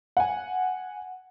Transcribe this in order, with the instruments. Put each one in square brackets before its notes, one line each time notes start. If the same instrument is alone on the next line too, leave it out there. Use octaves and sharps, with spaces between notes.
[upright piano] F#5 G#5